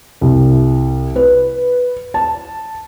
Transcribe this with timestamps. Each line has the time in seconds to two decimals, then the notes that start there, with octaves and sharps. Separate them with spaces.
0.21 C2
1.16 B4
2.14 A5